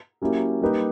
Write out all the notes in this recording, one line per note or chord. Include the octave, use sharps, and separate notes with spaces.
F#3 A#3 C#4 E4 G4
G3 A#3 D#4 G4 B4